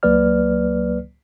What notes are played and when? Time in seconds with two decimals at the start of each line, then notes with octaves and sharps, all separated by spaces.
0.03 C#2 F#3 A#3 B4 D5 F6